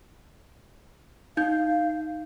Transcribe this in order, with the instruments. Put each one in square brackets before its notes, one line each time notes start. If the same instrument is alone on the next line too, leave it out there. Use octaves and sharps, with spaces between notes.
[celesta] D#4 G6 [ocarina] F5